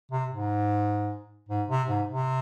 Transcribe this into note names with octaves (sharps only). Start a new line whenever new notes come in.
C3
G#2
G#2
C3
G#2
C3